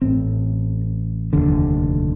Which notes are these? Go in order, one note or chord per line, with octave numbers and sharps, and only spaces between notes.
A1 A2 C4
F1 D#2 D3